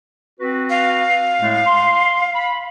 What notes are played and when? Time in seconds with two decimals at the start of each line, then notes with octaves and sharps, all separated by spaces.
0.40 C4 F#4 B4
0.70 F5
1.41 A2 G#3 A3
1.66 C6
2.35 B5